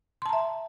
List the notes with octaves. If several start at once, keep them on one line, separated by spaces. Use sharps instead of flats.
E5 A5 A#5 C6